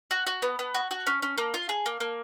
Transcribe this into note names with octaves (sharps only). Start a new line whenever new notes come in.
F#4
F#4
B3
B3
F#4
F#4
C#4
C#4
A#3
F4
G#4
A#3
A#3